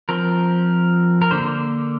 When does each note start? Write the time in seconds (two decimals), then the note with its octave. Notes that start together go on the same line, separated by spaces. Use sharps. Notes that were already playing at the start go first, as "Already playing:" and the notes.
0.09 F3 C4 A#4
1.22 A#4
1.31 D3 A#3 C5